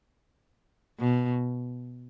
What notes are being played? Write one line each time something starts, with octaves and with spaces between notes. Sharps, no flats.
B2